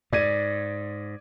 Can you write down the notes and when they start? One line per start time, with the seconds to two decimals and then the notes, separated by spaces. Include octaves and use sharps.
0.13 G#2 D5 G#6 D#7